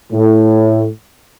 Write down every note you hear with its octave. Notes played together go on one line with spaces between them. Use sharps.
A2